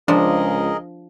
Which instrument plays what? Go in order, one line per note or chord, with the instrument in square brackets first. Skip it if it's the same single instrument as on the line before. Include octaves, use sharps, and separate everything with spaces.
[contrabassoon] C#2 [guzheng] F3 [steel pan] D4 [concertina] G#4 A#4 D#5